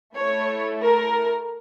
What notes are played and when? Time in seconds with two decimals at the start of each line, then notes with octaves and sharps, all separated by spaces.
0.14 A3 E4 A4 C#5
0.82 A#4